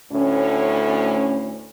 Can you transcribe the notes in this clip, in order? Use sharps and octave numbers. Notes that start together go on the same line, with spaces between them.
D2 A2 C#4